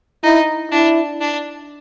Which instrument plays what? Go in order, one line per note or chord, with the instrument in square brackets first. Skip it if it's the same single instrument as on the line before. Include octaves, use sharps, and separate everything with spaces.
[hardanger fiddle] D#4 [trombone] E4
[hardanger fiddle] D4 [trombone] E4
[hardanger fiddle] D4